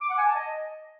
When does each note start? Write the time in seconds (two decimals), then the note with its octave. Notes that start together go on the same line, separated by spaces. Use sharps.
0.01 D6
0.09 F#5
0.18 G#5
0.26 A5
0.35 D#5